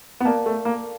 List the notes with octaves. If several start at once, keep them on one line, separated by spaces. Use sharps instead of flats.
B3
A#3 A#4 D5 F5 A5
A3
A#3